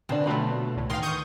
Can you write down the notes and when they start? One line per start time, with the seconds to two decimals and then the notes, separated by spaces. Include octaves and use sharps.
0.09 B2 D3 C4 D4
0.26 D3 F#3 A3 D4 F4 B5
0.76 C#2 A2
0.90 E2 D#3 F4 F5 C6
1.02 C#6 D#6 G6